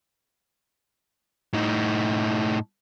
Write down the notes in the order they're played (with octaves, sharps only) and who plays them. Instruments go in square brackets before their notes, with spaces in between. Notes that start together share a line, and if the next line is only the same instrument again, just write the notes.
[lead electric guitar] A2 D#4